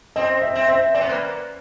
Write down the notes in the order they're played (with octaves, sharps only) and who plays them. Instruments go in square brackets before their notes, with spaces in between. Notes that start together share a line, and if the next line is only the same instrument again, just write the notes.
[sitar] C4 [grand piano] D#5
[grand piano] E5
[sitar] C4
[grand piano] E5
[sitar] C4 [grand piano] D5
[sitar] B3
A#3